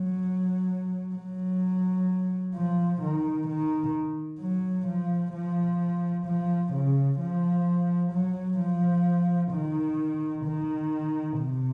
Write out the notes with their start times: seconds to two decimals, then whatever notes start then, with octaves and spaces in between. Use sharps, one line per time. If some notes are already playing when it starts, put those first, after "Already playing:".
Already playing: F#3
1.15 F#3
2.55 F3
3.01 D#3
3.48 D#3
4.40 F#3
4.87 F3
5.34 F3
6.26 F3
6.73 C#3
7.19 F3
8.12 F#3
8.59 F3
9.52 D#3
10.45 D#3
11.38 C3